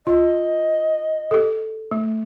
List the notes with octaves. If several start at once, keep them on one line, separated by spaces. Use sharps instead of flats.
F4 D#5
G4 A4
A3